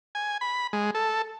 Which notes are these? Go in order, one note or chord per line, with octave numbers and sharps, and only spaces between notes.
G#5
B5
G#3
A4